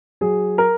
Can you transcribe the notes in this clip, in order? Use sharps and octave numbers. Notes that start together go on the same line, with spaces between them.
F#3 G#4
A#4